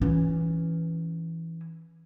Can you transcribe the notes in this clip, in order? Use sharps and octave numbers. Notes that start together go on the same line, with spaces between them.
E3 C#4